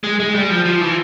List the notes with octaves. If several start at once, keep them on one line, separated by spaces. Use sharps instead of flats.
G#3
G#3
G3
F3
F3
E3